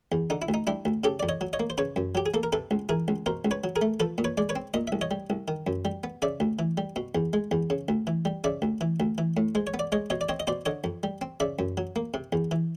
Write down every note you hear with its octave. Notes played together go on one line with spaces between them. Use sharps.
E2
D3 D#4
E4
D2
D#4
G3 D4 E4
D2
C#3 G4 A4
F2 D5
C#5 D#5
F#3
C#5 D#5
A#3
C5
C#3 B4 C#5
F#2
F#3 G4
G#4
A#3 A4
A#4
C3 A4 B4
C#2
E3 G#4 A#4
C#2
B2 A#4 C5
C#2
B4 C#5
F#3
G#4 A#4
A3
F3 A4 B4
A#2
B4 C#5
G#3 D5
B4 C#5
C4
A#2 D#5
C2 E5
C#5 D#5
G3
C2
D#3
F#2
G3
B3
C#3 D5 E5
D2
E3
G3
B2
E2
G#3
E2
C#3
D2
E3
G3
C#3 D5 E5
D2
E3
D2
E3
A2
G#3 C5
C#5
B3
D5
G#3 C#5 D#5
B2 C#5 D#5
D5
C4 C#5 D#5
D#5
B2 C5 D5
D3 C#5 D#5
F2
G3
C4
C#3 D5 E5
F#2
F#3
A#3
C3
E2
E3